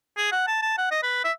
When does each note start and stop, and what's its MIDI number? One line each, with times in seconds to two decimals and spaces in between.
0.17 0.28 68
0.32 0.46 78
0.47 0.59 81
0.62 0.73 81
0.78 0.87 78
0.91 0.99 75
1.03 1.23 71
1.24 1.32 76